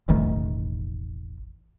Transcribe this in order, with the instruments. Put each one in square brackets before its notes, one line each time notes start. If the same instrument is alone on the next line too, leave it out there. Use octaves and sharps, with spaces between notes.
[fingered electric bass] E1 A1 D#3 A3